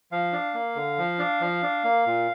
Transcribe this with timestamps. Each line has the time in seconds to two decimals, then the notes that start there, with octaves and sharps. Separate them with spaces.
0.12 F3 F5
0.33 D4
0.54 A#3
0.76 D3
0.98 F3
1.19 D4
1.41 F3
1.63 D4
1.84 A#3
2.06 A#2